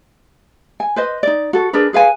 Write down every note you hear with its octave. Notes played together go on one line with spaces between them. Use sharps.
G#5
B4 C5 D#5
D#4 D5
F#4 A4
D4 G#4 A#4 B4
G#4 B4 F5 G#5